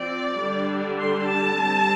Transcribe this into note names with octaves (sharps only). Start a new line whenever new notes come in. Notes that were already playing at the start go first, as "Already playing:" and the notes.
Already playing: F3 C4 D5
D3 G3 D4
C6
A5
G3 C4